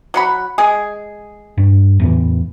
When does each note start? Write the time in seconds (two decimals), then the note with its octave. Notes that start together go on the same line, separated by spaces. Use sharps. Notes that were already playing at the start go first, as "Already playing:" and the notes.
0.14 F#3 F#5 B5
0.58 G#3 G#4
1.58 G2
2.00 E2 A2 E3